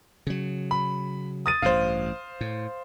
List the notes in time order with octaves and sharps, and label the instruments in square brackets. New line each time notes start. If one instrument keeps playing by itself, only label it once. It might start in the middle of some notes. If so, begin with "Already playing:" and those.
[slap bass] C#3 F#3
[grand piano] B5
D#6 A6 D#7
[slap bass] A1 G2 [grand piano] C5 F5
[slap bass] A2